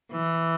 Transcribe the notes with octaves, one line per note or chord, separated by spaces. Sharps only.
E3